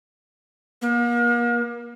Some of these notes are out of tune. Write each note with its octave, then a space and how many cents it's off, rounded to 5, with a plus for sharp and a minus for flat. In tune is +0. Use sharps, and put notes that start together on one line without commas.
A#3 +40